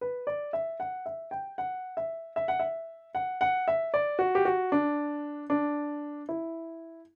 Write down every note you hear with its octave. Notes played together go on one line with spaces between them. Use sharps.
B4
D5
E5
F#5
E5
G5
F#5
E5
E5
F#5
E5
F#5
F#5
E5
D5
F#4
G4
F#4
D4
D4
E4